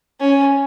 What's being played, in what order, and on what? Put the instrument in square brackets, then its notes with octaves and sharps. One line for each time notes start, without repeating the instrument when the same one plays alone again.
[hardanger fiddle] C#4